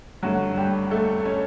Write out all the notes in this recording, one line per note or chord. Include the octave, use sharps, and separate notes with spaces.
G2 D3 F#3 A3 F#4
G3 G4
A3 A4
C#4 C#5